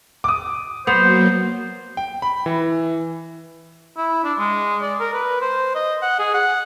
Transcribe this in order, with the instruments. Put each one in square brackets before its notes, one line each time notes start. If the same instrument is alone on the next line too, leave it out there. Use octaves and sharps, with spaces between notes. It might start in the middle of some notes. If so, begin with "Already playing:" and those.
[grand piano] D6 D#6
[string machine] F#3 A#3 [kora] B3 [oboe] C5 [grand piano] F7
[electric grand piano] G5
B5
E3
[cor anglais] E4
D4
G#3
D5
A#4
B4
C5
D#5
F#5
G#4
F#5